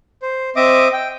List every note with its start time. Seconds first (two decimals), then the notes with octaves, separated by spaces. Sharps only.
0.22 C5
0.56 C4 D#5 E5 D6 D#6
0.93 G5